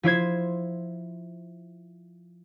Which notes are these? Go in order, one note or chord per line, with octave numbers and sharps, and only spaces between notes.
F3 E4 C5 G#6